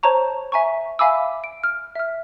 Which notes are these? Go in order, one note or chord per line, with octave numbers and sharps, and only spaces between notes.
C5 C#5 A5 A#5 C#6
E5 G#5 A#5 C#6
E5 F5 G#5 B5 D6 E6
D7
F6
E5 F6